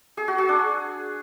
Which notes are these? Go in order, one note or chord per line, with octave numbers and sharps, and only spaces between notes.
G#4
F#4
G#4
D4